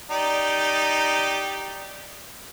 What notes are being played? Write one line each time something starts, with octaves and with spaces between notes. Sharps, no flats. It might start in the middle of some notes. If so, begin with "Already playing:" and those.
D#4 G4 D5